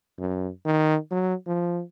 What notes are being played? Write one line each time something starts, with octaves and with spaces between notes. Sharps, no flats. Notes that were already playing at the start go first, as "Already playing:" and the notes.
F#2
D#3
F#3
F3